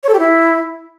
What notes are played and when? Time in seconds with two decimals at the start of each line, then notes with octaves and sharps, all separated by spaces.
0.03 C#5
0.09 A4
0.14 G4
0.19 E4